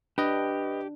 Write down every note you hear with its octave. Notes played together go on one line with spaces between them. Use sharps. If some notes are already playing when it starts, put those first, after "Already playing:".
D4 G4 B4 D#5